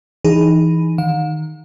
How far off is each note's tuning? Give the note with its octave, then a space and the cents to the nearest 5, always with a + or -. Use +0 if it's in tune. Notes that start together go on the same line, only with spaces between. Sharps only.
E3 +0 D#4 +0 G#4 +0
D#3 -5 F5 +45